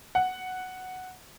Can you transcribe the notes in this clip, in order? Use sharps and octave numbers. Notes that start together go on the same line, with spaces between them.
F#5